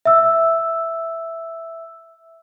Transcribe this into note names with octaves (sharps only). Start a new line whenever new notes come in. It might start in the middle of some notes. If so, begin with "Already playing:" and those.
E5 E6